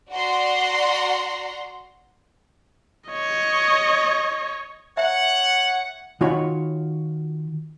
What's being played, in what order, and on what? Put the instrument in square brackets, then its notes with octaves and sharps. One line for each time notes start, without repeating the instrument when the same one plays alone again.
[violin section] F#4 D5 F#5 A#5 C6
[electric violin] C#5 D#5
[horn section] C#5 F#5 [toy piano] E5 A#5
[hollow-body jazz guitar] D#3 F4 F#4 C#5 G#5 B5